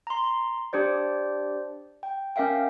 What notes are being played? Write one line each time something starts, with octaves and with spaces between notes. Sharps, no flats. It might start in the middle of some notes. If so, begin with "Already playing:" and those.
A#5 C6
D4 G4 C5 D5
G5
C#4 A#4 E5 F5 G5